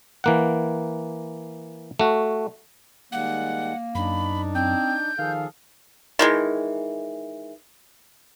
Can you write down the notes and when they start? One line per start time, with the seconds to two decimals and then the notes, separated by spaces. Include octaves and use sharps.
0.24 E3 A#3 F#5
1.99 A3 F#4
3.12 D#3 G3 G#3 A#3 F#5
3.95 F#2 D4 D#4 B5
4.55 C4 G6
5.19 D#3 F3 G#4 A4 F5
6.19 D#3 E3 G#3